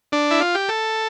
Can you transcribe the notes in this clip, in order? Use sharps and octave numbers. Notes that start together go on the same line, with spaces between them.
D4
E4
F4
G4
A4